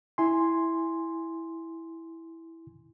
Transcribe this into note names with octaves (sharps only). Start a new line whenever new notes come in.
E4 G#5 C6